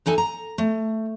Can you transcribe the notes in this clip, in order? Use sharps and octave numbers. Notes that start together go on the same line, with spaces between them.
E3 D#4 A4 G#5
A#5
A3